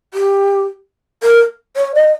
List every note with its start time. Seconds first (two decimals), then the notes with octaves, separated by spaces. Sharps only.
0.14 G4
1.23 A#4
1.76 C#5
1.95 D#5